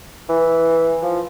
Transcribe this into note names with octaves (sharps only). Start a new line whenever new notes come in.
E3
F3